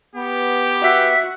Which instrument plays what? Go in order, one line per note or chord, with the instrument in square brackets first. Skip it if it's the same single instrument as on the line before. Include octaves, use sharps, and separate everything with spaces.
[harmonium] B3 [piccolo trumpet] G4
[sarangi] F#4 [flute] E5